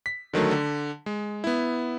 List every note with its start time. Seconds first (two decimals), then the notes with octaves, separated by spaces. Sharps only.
0.06 B6
0.33 D3 D#3 F#3 A3
0.51 D3
1.06 G#3
1.44 B3 E4